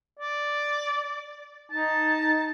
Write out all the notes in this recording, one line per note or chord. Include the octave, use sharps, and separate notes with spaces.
D5
D#4 A5